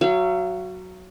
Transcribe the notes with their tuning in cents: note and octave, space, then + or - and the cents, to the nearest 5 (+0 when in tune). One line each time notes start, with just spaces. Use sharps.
F#3 +0 F5 -40